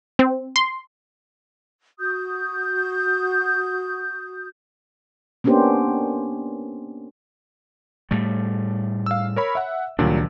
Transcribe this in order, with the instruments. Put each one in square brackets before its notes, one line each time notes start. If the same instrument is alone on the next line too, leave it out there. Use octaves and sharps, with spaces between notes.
[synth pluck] C4
C6
[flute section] F#4 D#6 G6
[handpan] A#3 B3 C#4 D4 G4 C5
[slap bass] A2 G3 A3
[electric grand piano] F5 E6
A#4 C#5 B5
E5 F#5
[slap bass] C#2 D#3 D4 [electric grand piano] A#2 F#3 G3